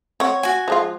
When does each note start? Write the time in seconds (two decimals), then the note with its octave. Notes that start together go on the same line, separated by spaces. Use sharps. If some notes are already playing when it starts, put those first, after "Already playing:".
0.20 C4 C#5 F#5
0.43 F#4 G#5
0.68 F3 G#3 F4